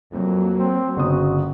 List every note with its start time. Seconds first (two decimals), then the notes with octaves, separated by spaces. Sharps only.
0.12 F2 F#3 A#3
0.58 C4
0.97 G1 C#3 F#4 D#6